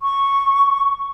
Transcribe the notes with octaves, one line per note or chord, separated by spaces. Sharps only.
C#6